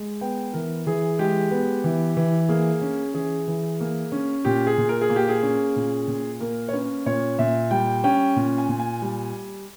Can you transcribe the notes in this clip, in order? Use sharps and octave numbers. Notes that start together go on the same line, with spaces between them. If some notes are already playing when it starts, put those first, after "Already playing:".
Already playing: G#3
B3 G5
E3 A#4
E3 G#4
G#3 G4
B3
E3
E3
A#3 G#4
C#4
E3 G#4
E3
A#3
C#4
A#2 G4
G#4
A#2
A#4
G#4
A#3
G4
G#4
C#4
A#2
A#2
A#3 A#4
C#5
C#4 B4
A#2 C#5
A#2 E5
G3 G5
C#4 G5
A#2
G#5
A#2
G#5
G3